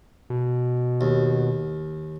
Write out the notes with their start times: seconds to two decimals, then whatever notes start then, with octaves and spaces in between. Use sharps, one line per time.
0.30 B2
1.01 D#2